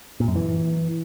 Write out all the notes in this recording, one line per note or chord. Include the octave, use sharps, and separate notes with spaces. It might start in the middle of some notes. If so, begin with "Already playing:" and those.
A#2
F#2
E3